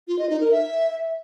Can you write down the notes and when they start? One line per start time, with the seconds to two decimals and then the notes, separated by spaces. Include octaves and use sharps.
0.08 F4
0.19 D#5
0.30 D#4
0.40 A#4
0.51 E5